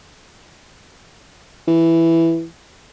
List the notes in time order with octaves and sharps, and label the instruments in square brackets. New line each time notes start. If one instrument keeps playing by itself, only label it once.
[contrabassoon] E3